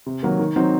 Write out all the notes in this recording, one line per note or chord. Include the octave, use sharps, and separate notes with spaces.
C3
D#3 F#3 A#3
D#3
F#3 C4 D#4